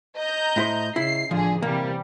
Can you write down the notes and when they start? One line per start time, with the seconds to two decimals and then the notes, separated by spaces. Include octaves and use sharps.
0.19 D#5 A#5 G6
0.56 A2 E4 C5
0.96 C#3 E4 C7
1.31 A1 D3 F3 G#4
1.62 C3 E3 G3 A#3